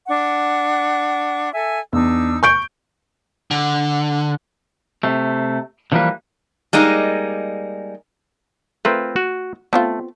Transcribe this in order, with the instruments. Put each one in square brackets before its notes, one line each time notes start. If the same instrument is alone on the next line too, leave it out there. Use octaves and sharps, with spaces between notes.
[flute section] D4 F#5 C#6
A4 E5 G#5
[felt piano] E2 [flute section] D4 D#4 E6
[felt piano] C#6 G6 D7
[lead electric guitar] D3
[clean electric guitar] C3 A3
D3 E3 F3 G3 A#3 B4
[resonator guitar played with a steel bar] G3 G#3 A#3 D#4
[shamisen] A3 A#4 [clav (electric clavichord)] C4 F4 B4
[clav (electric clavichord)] F#4
[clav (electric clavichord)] A3 [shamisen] B3 C4 F4